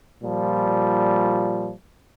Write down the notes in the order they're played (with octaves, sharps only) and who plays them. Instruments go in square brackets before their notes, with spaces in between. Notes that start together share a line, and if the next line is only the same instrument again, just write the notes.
[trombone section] A#2 F3 G3